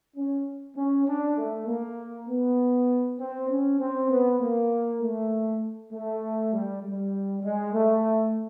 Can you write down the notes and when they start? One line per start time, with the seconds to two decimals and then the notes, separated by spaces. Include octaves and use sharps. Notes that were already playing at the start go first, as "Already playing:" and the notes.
0.16 C#4
0.76 C#4
1.07 D4
1.37 A3
1.67 A#3
2.28 B3
3.19 C4
3.49 C#4
3.80 C4
4.10 B3
4.40 A#3
5.01 A3
5.92 A3
6.53 G3
6.83 G3
7.43 G#3
7.74 A3